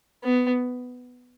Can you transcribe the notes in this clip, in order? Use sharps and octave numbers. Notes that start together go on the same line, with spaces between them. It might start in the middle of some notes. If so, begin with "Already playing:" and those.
B3